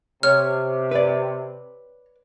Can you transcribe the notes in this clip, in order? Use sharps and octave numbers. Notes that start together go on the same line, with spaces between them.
C3 C#5 F6
B4 D5